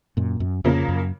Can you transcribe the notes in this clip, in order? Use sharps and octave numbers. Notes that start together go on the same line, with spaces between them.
F#2 A#2
F#2
F2 C#3 F3 A#3
F#2